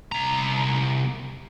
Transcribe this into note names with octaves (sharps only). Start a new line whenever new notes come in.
C2 A#5